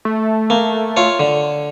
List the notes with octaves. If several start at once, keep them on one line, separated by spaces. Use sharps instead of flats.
A3
A#3
F4 C#5
D3